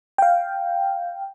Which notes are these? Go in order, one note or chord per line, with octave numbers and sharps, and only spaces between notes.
F5 G5